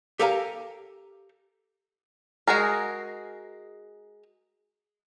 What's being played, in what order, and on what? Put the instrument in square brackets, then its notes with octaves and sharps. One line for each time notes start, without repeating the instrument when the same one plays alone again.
[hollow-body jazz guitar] G4 A4 A#4 F5 G#5 A#5
[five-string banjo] G#3 F#4 G#4 A#4